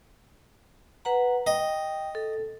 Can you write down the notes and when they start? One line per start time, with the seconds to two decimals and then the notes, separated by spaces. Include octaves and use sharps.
1.05 B4 F#5 A#5
1.47 D#5 G5
2.15 A4